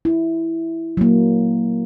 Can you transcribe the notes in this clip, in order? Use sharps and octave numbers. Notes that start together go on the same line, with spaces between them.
E4
F#3 A#3